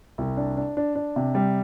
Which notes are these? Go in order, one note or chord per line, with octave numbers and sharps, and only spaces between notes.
C2
D4
D4
D4
D4
C3
G3